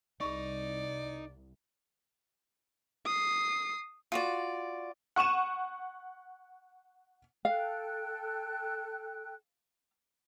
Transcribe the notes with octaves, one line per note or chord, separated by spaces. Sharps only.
C2 D#4 G#4 D5 B5 C#6
D#6 C7
F4 F#4 D5
F#5 C#6 D#7 E7
A4 F5 G5 F#6